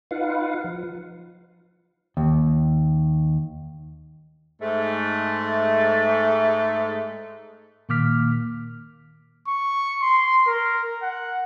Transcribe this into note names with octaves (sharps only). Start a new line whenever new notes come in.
D#4 F4 B4 F5 F#5
F3
D#2
G#2 A3
A#2 D#3 A#3 D6 F6 B6
C#6
C6
A#4
F#5